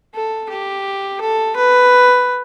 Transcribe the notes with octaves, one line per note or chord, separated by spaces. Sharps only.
A4
G4
A4
B4